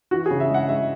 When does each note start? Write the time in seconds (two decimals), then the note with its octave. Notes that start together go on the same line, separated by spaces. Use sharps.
0.11 E3 F#4
0.26 G#4
0.31 C#3
0.40 E5
0.50 G#3 F#5
0.68 G#3 E5